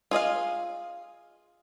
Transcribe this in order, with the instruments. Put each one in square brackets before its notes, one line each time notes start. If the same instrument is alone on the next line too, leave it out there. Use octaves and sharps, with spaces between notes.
[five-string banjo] F4 G#4 D#5 F5